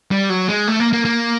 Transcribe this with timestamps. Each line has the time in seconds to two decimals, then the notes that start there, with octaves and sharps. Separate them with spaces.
0.11 G3
0.30 F#3
0.48 G#3
0.68 A3
0.80 A#3
0.93 A#3
1.05 A#3